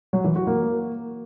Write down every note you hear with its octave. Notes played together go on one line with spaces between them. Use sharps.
F#3
E3
F#4
A#3